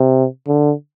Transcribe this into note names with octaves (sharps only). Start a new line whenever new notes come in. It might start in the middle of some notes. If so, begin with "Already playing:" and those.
Already playing: C3
D3